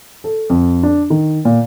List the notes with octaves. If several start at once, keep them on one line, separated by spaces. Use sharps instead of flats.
A4
F2
D4
D#3
A#2